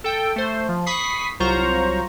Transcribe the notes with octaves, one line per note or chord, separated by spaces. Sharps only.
A4 G5
A3 C5
F3
B5 C#6 D#6 B6 C7
C2 F#3 F4 C5 A#5 C#6